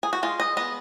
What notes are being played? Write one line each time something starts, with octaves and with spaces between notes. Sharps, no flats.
G#4
F#4
G#3 F4
D#5
B3 D#5